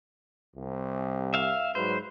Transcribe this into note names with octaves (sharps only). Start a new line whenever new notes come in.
C2
E5 F5
G#2 F#3 B4 C5